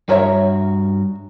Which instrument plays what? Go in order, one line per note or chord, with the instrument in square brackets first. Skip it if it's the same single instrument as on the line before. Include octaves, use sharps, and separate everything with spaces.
[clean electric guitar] G2 F#4 A#5 [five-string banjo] A#4 C#5 E5